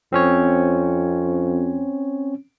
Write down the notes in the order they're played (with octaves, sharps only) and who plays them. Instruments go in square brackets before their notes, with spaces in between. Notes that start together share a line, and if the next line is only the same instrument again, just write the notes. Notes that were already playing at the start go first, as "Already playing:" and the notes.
[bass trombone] F2 [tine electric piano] C4 C#4 C#5